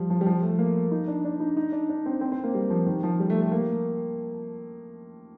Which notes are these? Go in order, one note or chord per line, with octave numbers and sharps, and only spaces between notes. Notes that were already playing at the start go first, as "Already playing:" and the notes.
Already playing: F3 G3
F3
G3
F3
A3
A#3
D#4
D4
D4
D#4
D#4
D4
D4
C4
C4
C4
A#3
G3
F3
D#3
F3
G3
A3
A3
A#3